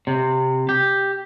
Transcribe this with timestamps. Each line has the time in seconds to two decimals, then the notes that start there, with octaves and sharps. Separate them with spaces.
0.07 C3
0.69 G4